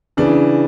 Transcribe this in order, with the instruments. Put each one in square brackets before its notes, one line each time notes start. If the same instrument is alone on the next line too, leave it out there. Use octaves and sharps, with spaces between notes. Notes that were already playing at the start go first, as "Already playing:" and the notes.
[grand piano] C#3 E3 D4